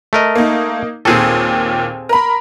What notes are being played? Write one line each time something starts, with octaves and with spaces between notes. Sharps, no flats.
A3 A#4 D#5
A#3 D#4
D#2 A#2 C4 G#4 A4
A#4 B5